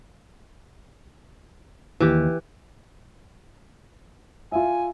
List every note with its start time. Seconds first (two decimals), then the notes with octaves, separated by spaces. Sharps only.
2.00 D#2 E3 G4
4.52 F4 E5 G#5